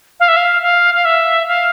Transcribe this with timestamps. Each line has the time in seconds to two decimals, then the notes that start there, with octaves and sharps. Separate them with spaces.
0.20 F5
0.28 E5
0.37 F5
0.63 F5
0.95 F5
1.05 E5
1.48 F5